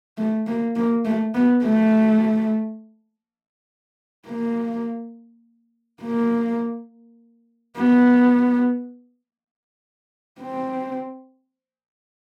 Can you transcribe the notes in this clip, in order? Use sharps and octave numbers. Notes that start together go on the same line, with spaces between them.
A3
A#3
A#3
A3
B3
A3
A#3
A#3
B3
C4